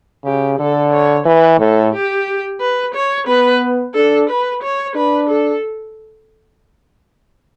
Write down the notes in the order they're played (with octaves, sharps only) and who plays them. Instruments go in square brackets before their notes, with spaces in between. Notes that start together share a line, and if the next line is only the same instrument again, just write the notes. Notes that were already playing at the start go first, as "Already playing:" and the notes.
[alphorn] C#3 [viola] G4
[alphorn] D3 [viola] A4
[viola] C#5
[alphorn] E3 [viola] B4
[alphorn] A2 [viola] A4
[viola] G4
B4
C#5
[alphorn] B3 [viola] B4
[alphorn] D4 [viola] A4
[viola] B4
C#5
[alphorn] D4 [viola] B4
[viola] A4